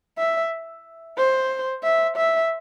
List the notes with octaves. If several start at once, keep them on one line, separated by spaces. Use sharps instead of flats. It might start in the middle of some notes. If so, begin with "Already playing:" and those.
E5
C5
E5
E5